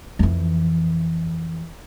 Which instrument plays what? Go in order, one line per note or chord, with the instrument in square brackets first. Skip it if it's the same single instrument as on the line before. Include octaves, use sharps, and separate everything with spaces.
[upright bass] F2 E3